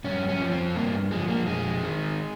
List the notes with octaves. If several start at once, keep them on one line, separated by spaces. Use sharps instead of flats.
G2 C#4
C#4
F3
C4
G2 A#3
F3 G#3
A#3
F2 G#3
D#3